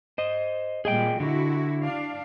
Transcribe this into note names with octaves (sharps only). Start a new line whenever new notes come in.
C5 D#5
A#2 G3 G#4 D#5 G5
D3 E4 F#4
D4 F5